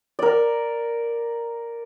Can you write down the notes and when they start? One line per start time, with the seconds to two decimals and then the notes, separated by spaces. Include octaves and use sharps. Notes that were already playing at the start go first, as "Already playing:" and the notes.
0.19 A#4 D5